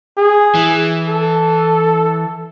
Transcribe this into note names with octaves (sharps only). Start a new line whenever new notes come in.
G#4
E3
A4